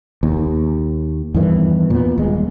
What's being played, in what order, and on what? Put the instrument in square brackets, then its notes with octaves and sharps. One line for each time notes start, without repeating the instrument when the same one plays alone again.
[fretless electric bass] D#2
E2 G2 D#3 E3
A#2 B3
D#1 G#3